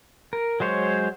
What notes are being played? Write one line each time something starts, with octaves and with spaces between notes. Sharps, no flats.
A#4
F#3 G#3 C5 C#5